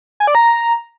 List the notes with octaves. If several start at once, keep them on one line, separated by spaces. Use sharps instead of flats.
G#5
D5
A#5